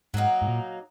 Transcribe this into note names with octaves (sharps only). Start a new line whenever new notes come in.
G#2 F#3 A#3 D#4
G#2
A#2